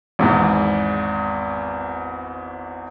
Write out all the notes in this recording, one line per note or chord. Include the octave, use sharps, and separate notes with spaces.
G#1 E2 G#2